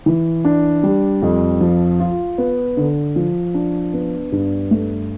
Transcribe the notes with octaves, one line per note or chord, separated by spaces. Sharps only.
E3
D4
G3
F2
F3
F4
B3
D3
F3
D4
B3
G2
A3